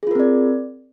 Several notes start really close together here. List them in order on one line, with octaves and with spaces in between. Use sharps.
G#4 F4 A#4 C4 D5